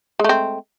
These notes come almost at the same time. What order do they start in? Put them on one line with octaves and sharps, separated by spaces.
G#3 A3 C4